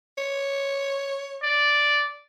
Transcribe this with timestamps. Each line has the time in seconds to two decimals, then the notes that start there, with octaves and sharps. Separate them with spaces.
0.18 C#5
1.43 D5